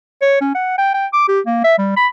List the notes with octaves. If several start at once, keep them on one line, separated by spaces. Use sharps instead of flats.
C#5
C#4
F#5
G5
G5
D6
G4
A#3
E5
G3
B5